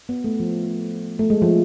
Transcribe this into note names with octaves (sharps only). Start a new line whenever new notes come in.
B3
A3
F3
A3
G#3
F3